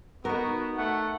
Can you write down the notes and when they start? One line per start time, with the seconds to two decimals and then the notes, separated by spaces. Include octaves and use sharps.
0.25 B3 D#4 F#4 A#4
0.77 A3 F#5